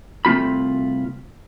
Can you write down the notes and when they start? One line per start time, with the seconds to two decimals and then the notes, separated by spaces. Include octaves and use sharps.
0.25 C2 A3 C4 F4 B5